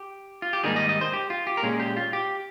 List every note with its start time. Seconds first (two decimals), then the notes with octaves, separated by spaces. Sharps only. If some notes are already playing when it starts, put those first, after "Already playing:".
Already playing: G4
0.42 F4
0.53 G4
0.64 G#2 D#3 G3 A#3 D#4 G#4
0.76 D#5
0.89 D#5
1.01 C5
1.13 G4
1.30 F4
1.47 G4
1.57 A#4
1.63 A#2 G#3 C#4 G#4
1.80 G4
1.97 F4
2.13 G4